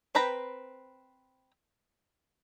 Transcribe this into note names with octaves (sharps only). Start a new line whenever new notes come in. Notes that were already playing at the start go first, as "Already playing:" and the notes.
C4 B4 G5 A#5 B5